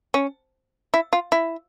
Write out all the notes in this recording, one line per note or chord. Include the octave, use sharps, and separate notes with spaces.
C#4
E4
F4
E4